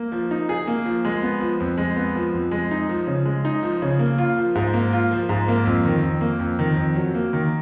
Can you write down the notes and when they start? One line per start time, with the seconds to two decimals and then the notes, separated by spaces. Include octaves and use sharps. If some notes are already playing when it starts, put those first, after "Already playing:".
Already playing: A#3
0.12 F3
0.31 D#4
0.49 G#4
0.67 A#3
0.85 F3
1.05 G#3
1.22 B3
1.41 F3
1.60 F2
1.78 G#3
1.96 B3
2.16 F3
2.34 F2
2.51 G#3
2.71 D#4
2.89 F3
3.07 C#3
3.26 G#3
3.45 D#4
3.63 F3
3.82 C#3
3.99 A#3
4.18 F4
4.37 F3
4.55 G#2
4.73 A#3
4.93 F4
5.11 F3
5.29 G#2
5.48 A#3
5.66 F2
5.85 D#3
6.02 F2
6.21 A#3
6.39 F2
6.59 D#3
6.77 F2
6.96 F#3
7.15 A#3
7.33 D#3